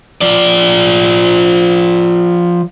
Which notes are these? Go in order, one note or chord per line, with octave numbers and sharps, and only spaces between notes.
F3 D5